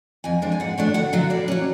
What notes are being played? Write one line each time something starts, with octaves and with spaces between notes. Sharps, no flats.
F2 G#5
F3 G#3 D4
G#5
G#2 F#5
F#3 A3 D4
D2 F#5
D3 F#3 F5
A2 D5
F#3 C#4